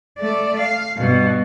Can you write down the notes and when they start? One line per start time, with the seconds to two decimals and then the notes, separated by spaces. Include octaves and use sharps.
0.19 A3 D5
0.59 F5
0.97 G2 B2